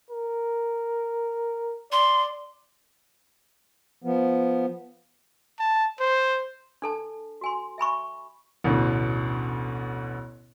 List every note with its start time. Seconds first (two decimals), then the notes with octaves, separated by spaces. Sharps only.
0.10 A#4
1.92 D5 C6
4.04 F3 B3
5.60 A5
6.00 C5
6.82 D4 A4 A5
7.41 F#4 G#5 C6
7.78 E5 G#5 B5 C#6
8.64 A1 D2 B2 D3